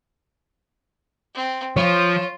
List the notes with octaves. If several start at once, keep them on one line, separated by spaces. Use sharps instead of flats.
C4
F3 F4 C#5